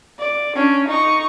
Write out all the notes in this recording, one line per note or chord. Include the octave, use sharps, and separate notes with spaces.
D5
C#4 D4
D#4 C#6